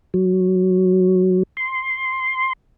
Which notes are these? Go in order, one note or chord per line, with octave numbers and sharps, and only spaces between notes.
F#3
C6